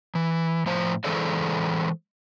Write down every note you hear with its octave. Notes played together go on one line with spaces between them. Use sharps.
E3
A2 F3 C5
E3 G#3 G#4 A4 C5 D5